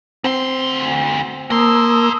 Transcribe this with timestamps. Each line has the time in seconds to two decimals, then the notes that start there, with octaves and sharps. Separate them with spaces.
0.24 D2 C4 C6
1.50 A#3 A#4 A5 C6 D#6 E6